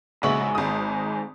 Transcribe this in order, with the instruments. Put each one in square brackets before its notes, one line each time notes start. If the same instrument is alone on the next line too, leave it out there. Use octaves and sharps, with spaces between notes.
[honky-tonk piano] A#1 C#3 F#7 [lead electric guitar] G#2 [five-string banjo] B3 F#4 E5
[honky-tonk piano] G#1 D#6